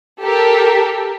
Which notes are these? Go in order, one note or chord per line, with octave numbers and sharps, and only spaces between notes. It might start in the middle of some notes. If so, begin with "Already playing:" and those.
G4 A4 A#4